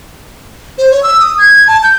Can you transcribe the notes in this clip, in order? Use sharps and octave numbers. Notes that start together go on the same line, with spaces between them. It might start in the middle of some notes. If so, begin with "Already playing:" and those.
C5
C#5
E6
D#6
G#6
G#6
A5
G6